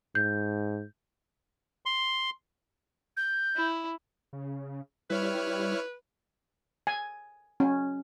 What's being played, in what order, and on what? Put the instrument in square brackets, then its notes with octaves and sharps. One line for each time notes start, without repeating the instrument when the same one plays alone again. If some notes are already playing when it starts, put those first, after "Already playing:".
[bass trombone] G#2 [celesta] G6
[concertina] C6
[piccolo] G6
[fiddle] E4
[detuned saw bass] C#3
[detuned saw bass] G3 [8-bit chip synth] E4 C#5 F6 [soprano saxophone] B4
[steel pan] G#5
C#4